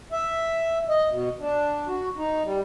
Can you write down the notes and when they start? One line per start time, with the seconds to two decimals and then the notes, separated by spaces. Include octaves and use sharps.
0.12 E5
0.89 D#5
1.11 B2
1.40 D4
1.88 F#4
2.17 D#4
2.44 G3